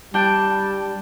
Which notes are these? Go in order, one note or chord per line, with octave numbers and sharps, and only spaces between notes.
G3 D4 G5 A5